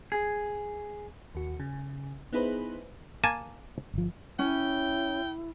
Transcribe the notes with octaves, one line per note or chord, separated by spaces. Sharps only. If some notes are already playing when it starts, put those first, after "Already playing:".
G#4
D#2 F#4
C#3
B3 D#4 E4 G#4 B4 C5
A#3 G#5 A5
G1 F3
C#4 E4 G5